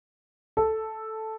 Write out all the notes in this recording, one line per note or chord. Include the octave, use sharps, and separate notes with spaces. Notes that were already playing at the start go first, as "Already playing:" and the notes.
A4